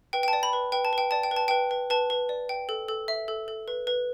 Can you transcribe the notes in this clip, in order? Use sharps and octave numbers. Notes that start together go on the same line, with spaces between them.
B4 G5
G5
A5
D5
B5
B4
B4 G5
A5
B4 G5
D5 A5
G5
B4
A5
B4 G5
B4
B4 A5
B4
D5
G5
A4
A4
E5
A4
A4
B4
B4